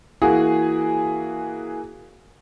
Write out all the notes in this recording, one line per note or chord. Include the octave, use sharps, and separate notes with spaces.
E3 A#3 F#4 G#4